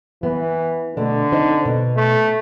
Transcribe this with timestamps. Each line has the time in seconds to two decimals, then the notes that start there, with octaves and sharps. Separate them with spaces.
0.23 E3 B3
0.97 B2 D3 A3 D4
1.32 C4 D#4 C5
1.65 B2
1.96 A3